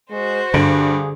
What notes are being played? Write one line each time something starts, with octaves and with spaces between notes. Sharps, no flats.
G#3 F#4 C5
G2 D3 G#4